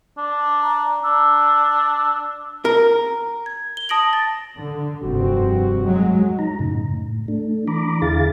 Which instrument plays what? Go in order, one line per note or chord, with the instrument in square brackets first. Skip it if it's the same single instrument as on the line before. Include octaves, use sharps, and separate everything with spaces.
[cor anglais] D4
[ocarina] A#5
[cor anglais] D4 [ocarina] E6
[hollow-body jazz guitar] A#4
[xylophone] G#6
G7
A5 D#6 A#6 D7 F#7
A6
[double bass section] D3
[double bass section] F1 G2 C4 [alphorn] F#4
[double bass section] F#3 G#3
[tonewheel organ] D#4 A#5
F#2 A2 C#3
A2
A3 D4
E3 D4 A#5 B5 D6
E2 D3 E4 G#4 F5 A6